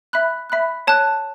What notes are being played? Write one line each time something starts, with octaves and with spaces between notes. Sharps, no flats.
E5 B5 F#6
E5 B5 F#6
C#5 A5 F#6